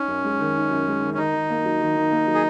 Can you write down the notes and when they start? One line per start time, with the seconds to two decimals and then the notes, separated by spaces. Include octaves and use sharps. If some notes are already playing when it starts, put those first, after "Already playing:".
Already playing: C#4 D#4
0.08 F#2
0.24 G#3
0.39 D#3
0.55 D#4
0.70 F#2
0.87 G#3
1.02 D#3
1.14 C#4
1.18 D#3 D#4
1.34 D#3
1.50 A#3
1.65 F#3
1.81 D#3
1.96 D#3
2.12 A#3
2.27 F#3
2.35 G#4